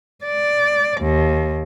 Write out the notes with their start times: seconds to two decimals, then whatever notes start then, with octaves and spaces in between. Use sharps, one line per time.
0.25 D5
1.01 D#2